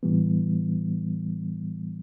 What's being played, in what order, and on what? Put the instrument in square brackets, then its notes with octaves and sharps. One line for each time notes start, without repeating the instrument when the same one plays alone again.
[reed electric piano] A2 E3 G3 B3